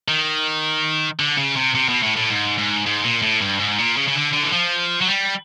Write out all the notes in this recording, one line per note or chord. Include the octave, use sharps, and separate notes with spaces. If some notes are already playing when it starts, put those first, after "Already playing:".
D#3
D3
C#3
C3
C3
B2
A2
A2
G#2
G#2
G#2
A#2
A2
G2
G#2
A#2
C#3
C#3
D3
D3
E3
F3
F#3
G3